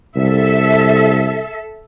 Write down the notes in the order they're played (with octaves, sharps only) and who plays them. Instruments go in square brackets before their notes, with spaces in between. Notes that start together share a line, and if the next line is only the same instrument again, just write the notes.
[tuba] C2 [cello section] A4 E5